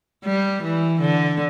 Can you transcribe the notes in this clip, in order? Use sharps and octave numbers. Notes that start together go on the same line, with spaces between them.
G3
E3
D3